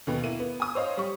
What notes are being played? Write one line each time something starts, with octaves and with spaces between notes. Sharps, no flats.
D#2 B2 B3
A#3 E4 D#7
B3
G#5 D#6
C5 C#5 D#5 F5
G3 C#6